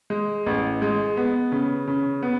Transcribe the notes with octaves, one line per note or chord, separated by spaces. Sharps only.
G#3
A1
G#3
B3
C#3
C#3
B3